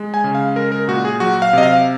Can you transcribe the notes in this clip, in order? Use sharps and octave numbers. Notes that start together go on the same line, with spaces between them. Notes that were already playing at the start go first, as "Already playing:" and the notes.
Already playing: G#3
G#5
C#3
F5
G#3 A#4
A#4
A#2 F#4
G#4
F#3 F#4
F5
C3 D#5
F5